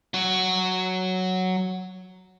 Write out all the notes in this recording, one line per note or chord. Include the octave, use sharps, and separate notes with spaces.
F#3 F#4